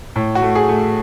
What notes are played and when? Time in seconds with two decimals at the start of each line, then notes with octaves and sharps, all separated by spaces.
0.16 A2
0.35 F#4
0.42 A3
0.56 G#4
0.69 A3